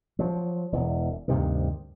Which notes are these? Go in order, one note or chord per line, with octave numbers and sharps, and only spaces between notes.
F3 F#3
E1 E2
D2 G2 C3 D#3